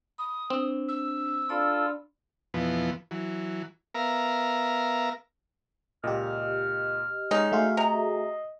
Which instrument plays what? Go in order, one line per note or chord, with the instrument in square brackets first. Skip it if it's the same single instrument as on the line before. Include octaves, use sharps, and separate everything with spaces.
[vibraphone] B5 [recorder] D#6
[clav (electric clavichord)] C4 [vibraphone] D4
[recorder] E6
[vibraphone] D4 D5 B5 [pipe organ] F4 A4
[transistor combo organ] F2 B2 E3 F3 B3
E3 F#3
B3 A#4 E5 F5 A#5
[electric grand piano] C#2 A#2 [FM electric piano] G4 D#5 [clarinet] F6
[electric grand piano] G#3 [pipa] C#4 D#4
[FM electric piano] A3 F#4 G#4 [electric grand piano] E5 C6 [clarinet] F5
[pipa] C3 A#5 [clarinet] D#5